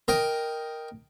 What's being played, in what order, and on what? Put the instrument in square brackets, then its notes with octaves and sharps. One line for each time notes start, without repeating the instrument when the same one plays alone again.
[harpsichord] A#4 D#5 G5